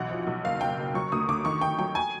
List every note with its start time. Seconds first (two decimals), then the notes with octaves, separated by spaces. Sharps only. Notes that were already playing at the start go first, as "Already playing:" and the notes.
Already playing: B1 E3 F#5
0.11 F3
0.27 B1
0.44 F#1 F5
0.61 F#1 G5
0.78 F#1
0.94 F#3 C#6
1.12 D2 D#6
1.28 D2 D6
1.45 D#3 C#6
1.61 D#3 G5
1.79 F#3 G5
1.95 G#5